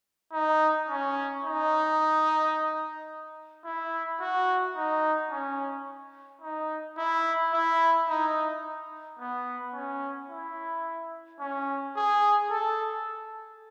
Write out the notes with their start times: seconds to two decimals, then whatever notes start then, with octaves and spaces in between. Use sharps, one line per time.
0.33 D#4
0.89 C#4
1.44 D#4
3.65 E4
4.21 F#4
4.77 D#4
5.31 C#4
6.42 D#4
6.98 E4
7.53 E4
8.09 D#4
9.19 B3
9.74 C#4
10.30 E4
11.40 C#4
11.96 G#4
12.51 A4